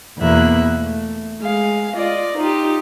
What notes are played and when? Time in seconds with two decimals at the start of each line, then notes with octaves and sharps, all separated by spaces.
0.19 E2 B2 A#3 E5 F#6
0.77 A3
1.41 G#3 F5
1.95 F4 D5 D#5
2.37 D#4 F4 G4